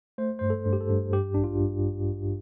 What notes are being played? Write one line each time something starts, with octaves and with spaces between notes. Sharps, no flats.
A3 C5
G2 C5
A4
G2
G4
A4
G2
G2 G4
A1 D4
F4
G2